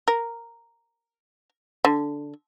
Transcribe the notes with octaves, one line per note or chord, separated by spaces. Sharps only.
A#4
D3